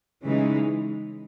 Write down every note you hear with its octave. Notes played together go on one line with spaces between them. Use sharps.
C#3 E3 G#3 D#4